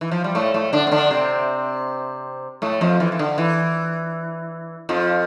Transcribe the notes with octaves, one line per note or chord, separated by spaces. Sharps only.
E3
F3
G3
A2 A3
A2 A3
D3 D4
C4
D3 D4
C3 C4
A2 A3
F2 F3
E3
E3
D3
E3
F2 F3